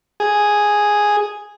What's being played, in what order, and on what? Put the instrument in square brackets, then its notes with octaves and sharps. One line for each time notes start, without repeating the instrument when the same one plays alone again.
[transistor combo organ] G#4